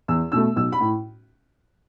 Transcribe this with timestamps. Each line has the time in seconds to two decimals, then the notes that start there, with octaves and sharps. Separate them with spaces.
0.08 E2 E6
0.32 B2 A3 E6
0.56 B1 E6
0.72 B5
0.80 A2